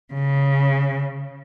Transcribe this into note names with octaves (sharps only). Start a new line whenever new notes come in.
C#3